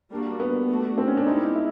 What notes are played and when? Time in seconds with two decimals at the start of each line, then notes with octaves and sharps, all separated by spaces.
0.11 G3 A#3 D4 F#4
0.40 B3
0.69 A3 D4 F#4
0.98 C4
1.08 C#4
1.17 D4
1.26 G#3 B3 D#4 E4 G4
1.55 E4